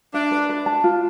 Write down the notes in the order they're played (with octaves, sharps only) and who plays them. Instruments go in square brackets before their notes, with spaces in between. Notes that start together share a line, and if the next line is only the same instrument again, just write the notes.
[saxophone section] D4 [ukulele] E5
[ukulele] B4
B4
A5
F4